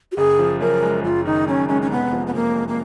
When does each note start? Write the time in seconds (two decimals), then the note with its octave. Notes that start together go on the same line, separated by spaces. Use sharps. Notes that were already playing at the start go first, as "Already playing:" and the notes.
0.12 F#4
0.17 F#1 G#4
0.39 F3
0.60 F#2 A#4
0.82 G#3
1.04 F#1 F4
1.25 D#3 D#4
1.47 F#2 C#4
1.69 G#3 C#4
1.82 C#4
1.91 F1 B3
2.12 F3
2.27 B3
2.34 F2 A#3
2.56 G#3
2.68 A#3